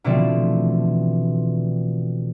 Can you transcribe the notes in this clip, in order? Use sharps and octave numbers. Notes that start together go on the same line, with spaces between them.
B2 D3 E3 F3 A3 C4